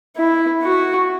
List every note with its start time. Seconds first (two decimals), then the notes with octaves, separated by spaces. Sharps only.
0.17 E4
0.63 F#4